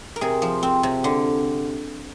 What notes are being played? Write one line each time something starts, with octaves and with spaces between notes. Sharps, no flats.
A#4
C3 G#4
F3
C4
C3
D3